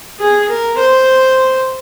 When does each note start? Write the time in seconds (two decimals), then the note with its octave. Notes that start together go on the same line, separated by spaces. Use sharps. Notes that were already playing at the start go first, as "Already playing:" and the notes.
0.20 G#4
0.49 A#4
0.78 C5